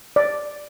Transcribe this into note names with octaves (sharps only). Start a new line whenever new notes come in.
D5